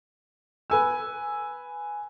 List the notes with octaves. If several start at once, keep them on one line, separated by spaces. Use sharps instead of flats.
B4 G#5 E6